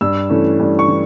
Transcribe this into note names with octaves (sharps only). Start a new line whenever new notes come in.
G2 E6
E3 A3 C#4
G2
C#6
E3